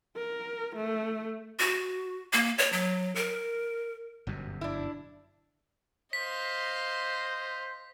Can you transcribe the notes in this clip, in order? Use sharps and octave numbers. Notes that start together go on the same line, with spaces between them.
A#4
A3
F#4
A#3
C#5
F#3
A#4
G1 F#2 B2
D4 E4
C5 D#5 F5 B6